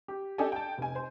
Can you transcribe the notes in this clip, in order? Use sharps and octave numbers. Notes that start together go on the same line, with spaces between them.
G4
D4 G4 A4 D#5 G#5
G5 A5
F1 G#5
C5